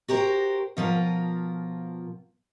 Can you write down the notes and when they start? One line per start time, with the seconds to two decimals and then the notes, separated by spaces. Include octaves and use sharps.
0.08 F#4 G4 A#4 C5
0.77 B2 F3 F4 A#4